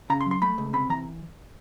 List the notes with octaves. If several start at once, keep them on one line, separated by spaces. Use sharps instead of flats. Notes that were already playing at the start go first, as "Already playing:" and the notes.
C#3 A#5
C6
F#3
C6
A3 B5
C#2
C3 B5
E3 A#5